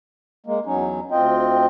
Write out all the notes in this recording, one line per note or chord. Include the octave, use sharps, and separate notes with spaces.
G#3 A#3
E2 F#3 C#4 D#4
D2 C4 F4 D#5 G5